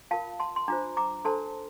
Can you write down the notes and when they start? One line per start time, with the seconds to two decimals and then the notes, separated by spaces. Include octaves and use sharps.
0.11 F4 A#4 F5 A5
0.40 A5 C6
0.56 C6
0.68 D4 F4 C5 A#5 D6
0.97 A#5 D6
1.25 D4 A4 C5 A5 C6